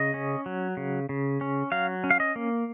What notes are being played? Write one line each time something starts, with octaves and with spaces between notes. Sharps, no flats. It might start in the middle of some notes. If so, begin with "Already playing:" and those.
Already playing: C#3 D#5
C#4
F#3
C#3
C#3
C#4
F#3 F5
C#4
F5
D#5
A#3